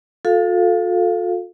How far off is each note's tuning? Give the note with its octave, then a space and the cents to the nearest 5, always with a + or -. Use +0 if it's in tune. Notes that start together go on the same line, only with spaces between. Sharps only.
F4 +45 A4 +0 F5 +0